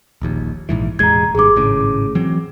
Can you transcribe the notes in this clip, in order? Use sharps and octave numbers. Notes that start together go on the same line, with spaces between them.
D#1 A#1 D#2
A#1 G#2 E3
E1 A1 G#3 A#5 G#6
G#1 G2 G#4 D6
G#1 A2 C#3
E3 F#3 C4